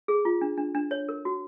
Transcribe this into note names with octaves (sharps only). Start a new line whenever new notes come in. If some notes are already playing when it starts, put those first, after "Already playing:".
G#4
F4
D4
D4
D4
C#5
A#4
F#4